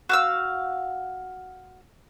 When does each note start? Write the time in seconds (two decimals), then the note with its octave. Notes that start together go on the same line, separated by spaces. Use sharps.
0.09 F#4 F5 E6